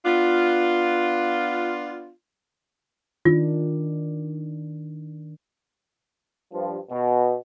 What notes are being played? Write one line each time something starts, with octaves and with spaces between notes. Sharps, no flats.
B3 D4 F4
D#3 D4 F4
G2 F3
B2